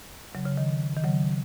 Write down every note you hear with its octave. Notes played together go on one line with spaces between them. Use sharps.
C#3 F#3
C#3
D#3
D#3
C#3 F#3